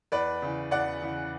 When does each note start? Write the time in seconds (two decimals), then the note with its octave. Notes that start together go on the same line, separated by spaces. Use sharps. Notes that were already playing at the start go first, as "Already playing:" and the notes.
0.12 E2 B4 D5
0.42 C#3 E3
0.71 E2 D5 F#5
1.02 C#3 E3